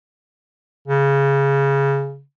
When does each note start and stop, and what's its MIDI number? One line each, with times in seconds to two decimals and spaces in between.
0.88 2.22 49